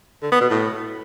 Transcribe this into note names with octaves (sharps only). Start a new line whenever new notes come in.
D3
B3
B2
A2